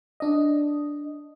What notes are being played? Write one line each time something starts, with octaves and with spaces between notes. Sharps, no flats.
D4 D#5